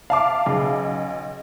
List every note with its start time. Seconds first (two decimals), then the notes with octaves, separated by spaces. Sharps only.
0.10 E5 F5 A5 D6
0.46 B1 C#3